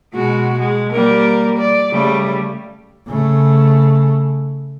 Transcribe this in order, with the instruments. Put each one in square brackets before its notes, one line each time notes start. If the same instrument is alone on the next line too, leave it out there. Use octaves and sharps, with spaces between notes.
[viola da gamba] B2 G#3 F#4
G#3
G3 A#3 A#4
D5
C#3 G3 A3
[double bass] C#3 A3